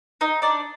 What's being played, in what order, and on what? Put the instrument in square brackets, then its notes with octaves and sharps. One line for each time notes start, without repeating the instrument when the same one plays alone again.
[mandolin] D#4 D#5
D4 D5